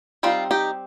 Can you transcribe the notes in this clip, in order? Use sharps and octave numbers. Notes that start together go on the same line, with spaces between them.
G3 C4 D#4 F4
D#4 G4